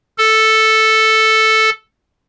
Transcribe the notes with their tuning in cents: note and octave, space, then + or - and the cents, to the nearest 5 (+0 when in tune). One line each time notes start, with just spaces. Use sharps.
A4 +0